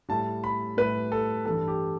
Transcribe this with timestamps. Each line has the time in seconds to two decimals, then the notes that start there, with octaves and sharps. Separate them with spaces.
0.09 A2 G3 A5
0.44 B5
0.77 A2 G3 B4
1.12 A4
1.45 G2 E3 G3 A4
1.68 G4